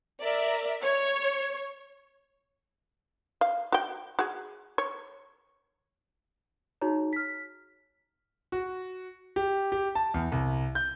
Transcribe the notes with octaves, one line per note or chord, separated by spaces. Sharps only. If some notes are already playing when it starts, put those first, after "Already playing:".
A#4 D5 E5
C#5
F5
F#4 G5
F#4 G#4
C#5
D#4 F#4 G#4 C#5 A#5
F6 B6
F#4
G4
G4
A5
E2
C2
G6